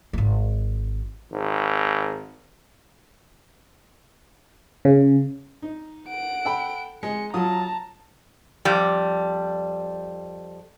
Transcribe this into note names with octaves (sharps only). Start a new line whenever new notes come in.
D1 G#1
G#1
C#3
D#4
F#5 D7
A4 G5 B5
G#3 C#7
F#3 F4 A5 A#5 D#6
F2 G3